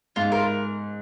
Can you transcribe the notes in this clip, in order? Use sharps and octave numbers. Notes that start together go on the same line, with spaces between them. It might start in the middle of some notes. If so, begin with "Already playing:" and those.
G#2 F4
A#4